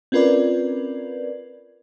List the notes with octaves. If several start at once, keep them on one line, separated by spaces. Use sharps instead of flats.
C4 C#4 F4 A#4 B4 D5